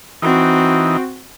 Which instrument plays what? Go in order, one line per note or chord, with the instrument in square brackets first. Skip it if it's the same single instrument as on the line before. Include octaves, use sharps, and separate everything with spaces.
[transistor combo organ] E3 D#4 [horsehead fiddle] C4 F#4